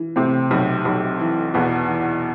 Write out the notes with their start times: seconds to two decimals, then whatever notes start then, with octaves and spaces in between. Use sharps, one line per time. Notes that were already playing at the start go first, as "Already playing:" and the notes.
Already playing: E3
0.16 A2 C3 C4
0.51 B1
0.85 B1
1.20 E3
1.54 E2 B2 B3
1.89 E3